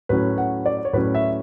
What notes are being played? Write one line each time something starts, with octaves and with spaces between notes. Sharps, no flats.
A2 F#3 C#4 B4
F#5
D5
C#5
A2 F#3 C#4 B4
E5